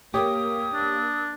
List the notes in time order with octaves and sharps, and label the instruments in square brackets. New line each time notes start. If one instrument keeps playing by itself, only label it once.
[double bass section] A#3 [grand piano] G4 C#5 D6 [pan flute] D#6
[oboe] D4